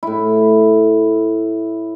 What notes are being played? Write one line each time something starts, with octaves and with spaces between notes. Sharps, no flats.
A2 E4